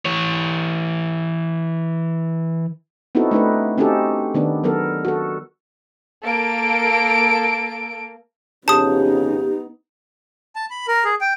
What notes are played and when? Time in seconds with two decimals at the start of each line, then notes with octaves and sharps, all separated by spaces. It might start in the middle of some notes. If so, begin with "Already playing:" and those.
0.05 E3 C#5
3.15 B3 C4 D#4 E4 F#4 A4
3.31 A3 D4 D#4 B4
3.78 C4 C#4 D#4 F#4 G4 A4
4.34 D#3 B3 D4
4.64 F#3 B3 A4 A#4
5.05 F#4 A4
6.24 A#3 A4 D7
8.68 F2 C#3 B3 C#4 D#4 G4 A5 D#6
10.56 A5
10.70 B5
10.88 A#4
11.05 G#4
11.21 G5